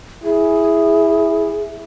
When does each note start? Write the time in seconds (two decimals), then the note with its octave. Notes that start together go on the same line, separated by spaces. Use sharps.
0.24 E4 G#4